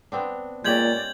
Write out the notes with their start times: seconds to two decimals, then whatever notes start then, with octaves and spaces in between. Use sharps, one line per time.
0.12 B3 C4 D4
0.64 A#2 G#3 C#4 G4 D5 G6 G#6 F#7